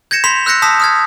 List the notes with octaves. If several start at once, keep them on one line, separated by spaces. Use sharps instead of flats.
G6 G#6 A#6 C#7 E7
B5 C6 B6 F7
E6 F#6 G6 A#6 C#7
A5 D#6 E6 G6 B6
D#6 F6 G#6